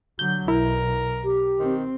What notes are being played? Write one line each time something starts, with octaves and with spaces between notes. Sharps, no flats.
D3 F#3 G6
B1 E4 A#4
G4
D#3 C4